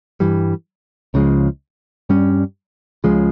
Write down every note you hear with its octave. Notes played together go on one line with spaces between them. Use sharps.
G2 E3 G3
C#2 C#3 F3 G#3
G2 G3 C#4
C#2 C#3 F3 G#3